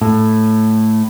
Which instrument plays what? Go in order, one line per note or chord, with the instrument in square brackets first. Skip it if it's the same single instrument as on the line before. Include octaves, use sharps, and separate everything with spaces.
[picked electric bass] A2